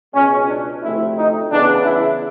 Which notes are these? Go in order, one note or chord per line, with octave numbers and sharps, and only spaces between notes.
C#2 B2 G#3 C#4
D4
D2 C3 F3 A3 C4 E4
D#4
E2 C#3 E3 D4
E4